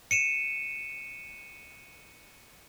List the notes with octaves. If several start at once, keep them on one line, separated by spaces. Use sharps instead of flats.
C#7 D#7 E7